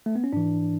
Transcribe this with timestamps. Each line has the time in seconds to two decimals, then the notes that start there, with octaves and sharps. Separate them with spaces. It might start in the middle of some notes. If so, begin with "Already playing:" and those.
0.06 A3
0.16 B3
0.24 C#4
0.33 G#2 E3 D4